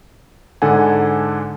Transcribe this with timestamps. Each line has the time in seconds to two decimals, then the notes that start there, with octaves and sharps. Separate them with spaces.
0.62 G#2 D3 A4 F#5 G#5